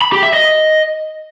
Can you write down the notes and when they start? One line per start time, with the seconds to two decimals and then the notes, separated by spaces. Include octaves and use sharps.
0.02 B5
0.12 G4
0.23 E5
0.33 D#5